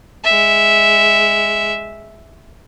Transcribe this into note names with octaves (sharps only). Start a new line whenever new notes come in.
G#3 E5